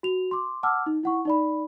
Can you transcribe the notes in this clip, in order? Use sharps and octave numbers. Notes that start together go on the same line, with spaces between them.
F#4 F7
C6 D6
F#5 A5 D6 E6 F6
D#4
E4 F#5 C#6
D#4 D5 B5